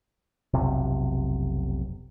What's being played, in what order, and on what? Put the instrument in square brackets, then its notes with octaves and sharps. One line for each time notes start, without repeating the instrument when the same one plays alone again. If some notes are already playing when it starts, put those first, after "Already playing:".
[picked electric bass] F1 B1 C3